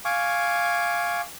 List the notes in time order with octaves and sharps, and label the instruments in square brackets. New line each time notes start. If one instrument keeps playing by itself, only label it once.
[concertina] F5 G#5 C#6 D6